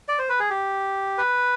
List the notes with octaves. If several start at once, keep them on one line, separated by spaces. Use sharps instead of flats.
D5
C5
B4
G#4
G4
B4